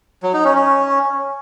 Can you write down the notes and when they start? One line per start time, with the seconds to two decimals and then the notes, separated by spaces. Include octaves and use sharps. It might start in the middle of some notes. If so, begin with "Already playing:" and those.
0.23 F#3
0.34 D#4
0.44 C#4
0.55 C#4